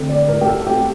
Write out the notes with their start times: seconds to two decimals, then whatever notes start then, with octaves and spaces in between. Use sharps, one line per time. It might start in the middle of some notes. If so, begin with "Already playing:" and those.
Already playing: D3 A3 C4
0.09 D5
0.28 A2 A#4
0.41 G4
0.47 A4
0.67 A3 C4 G4